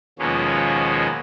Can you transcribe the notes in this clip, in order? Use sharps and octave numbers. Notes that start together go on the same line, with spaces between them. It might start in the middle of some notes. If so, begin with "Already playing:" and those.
D#2 B2 F3 G#3 A#3 C#4